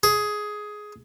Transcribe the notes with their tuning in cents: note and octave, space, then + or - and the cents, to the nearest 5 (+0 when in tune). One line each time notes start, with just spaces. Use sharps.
G#4 +10